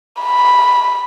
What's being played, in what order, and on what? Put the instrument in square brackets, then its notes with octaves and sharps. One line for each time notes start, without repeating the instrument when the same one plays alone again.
[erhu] B5